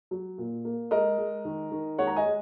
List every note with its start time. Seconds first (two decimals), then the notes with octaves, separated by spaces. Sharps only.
0.11 F#3
0.38 A#2
0.65 A#3
0.91 G#3 A#4 D#5
1.18 G#3
1.45 D#3
1.72 D#3
1.98 G#3 C#5 F#5
2.07 A#5
2.16 D#5 G#5
2.25 G#3